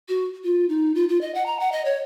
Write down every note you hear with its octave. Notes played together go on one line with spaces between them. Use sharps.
F#4
F4
D#4
F4
F4
D#5
F#5
A#5
F#5
D#5
C#5